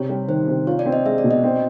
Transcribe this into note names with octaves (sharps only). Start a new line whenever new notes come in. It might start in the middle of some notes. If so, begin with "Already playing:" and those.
Already playing: C3 C#5
G3
D#3 C5
C3
F4 C#5
D5
C4
D#5
G#3 E5
D5
B2
D#5
C4